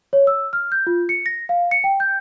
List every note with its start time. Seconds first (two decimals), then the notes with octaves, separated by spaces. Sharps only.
0.13 C#5
0.27 E6
0.53 F6
0.72 G6
0.87 F4
1.09 C#7
1.26 A#6
1.49 F5
1.71 C#7
1.84 G5
2.00 G6